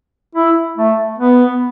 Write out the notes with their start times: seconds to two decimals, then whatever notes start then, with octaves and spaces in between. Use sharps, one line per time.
0.35 E4
0.78 A3
1.18 B3